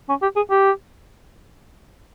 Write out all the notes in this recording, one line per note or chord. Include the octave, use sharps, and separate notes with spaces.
C#4
G4
G#4
G4